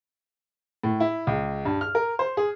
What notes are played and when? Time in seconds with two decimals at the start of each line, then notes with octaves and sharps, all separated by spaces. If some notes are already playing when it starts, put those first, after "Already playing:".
0.84 A2
1.00 E4
1.27 C#2
1.65 G2
1.81 F6
1.95 A#4
2.19 C5
2.37 G#4